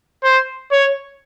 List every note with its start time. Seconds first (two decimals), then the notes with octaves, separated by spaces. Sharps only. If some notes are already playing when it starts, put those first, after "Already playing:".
0.24 C5
0.72 C#5